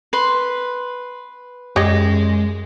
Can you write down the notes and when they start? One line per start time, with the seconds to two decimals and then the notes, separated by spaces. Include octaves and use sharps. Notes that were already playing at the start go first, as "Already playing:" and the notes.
0.13 B4 C6
1.76 F#2 G#3 G4 C#5 D#5 A#6